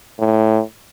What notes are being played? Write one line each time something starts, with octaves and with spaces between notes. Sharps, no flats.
A2